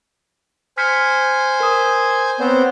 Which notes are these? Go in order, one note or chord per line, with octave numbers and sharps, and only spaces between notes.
C5 G#5 F6 B6 C#7
A#4 D#6
B3 C4 C5 C#5